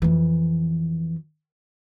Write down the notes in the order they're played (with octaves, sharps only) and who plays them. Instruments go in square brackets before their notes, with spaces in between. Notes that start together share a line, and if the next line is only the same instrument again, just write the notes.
[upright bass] F2 E3